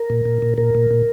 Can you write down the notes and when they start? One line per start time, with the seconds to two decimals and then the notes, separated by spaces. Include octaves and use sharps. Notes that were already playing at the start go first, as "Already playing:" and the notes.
Already playing: A#4
0.10 A#2
0.25 A#2
0.42 A#2
0.58 A#2 A#4
0.75 A#2
0.91 A#2